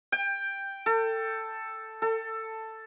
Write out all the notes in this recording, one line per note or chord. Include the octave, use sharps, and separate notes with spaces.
G5
A4
A4